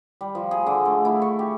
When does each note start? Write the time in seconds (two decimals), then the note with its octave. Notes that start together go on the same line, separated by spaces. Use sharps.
0.21 G3
0.35 F3
0.51 G#4
0.66 D3
0.85 A3
1.05 E4
1.22 C#6
1.39 G4